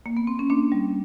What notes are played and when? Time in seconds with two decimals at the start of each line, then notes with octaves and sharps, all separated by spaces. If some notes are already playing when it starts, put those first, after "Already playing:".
0.06 A#3
0.17 B3
0.27 C4
0.39 C#4
0.50 A#3 C4 D4
0.72 G3